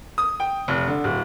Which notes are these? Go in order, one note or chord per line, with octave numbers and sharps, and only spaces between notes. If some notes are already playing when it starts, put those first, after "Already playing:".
D#6
G5
F1
D3
D1